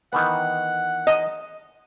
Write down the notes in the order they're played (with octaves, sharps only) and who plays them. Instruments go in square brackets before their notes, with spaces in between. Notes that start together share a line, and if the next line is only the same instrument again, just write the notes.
[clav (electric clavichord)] D#3 E3 B3 [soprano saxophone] F#5
[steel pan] D#5